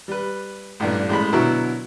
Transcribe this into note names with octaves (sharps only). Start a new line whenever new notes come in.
G3 B4
A1 G2 A#2
A1 G#3 B5
B2 D3 F#3 E4 F#4 A#4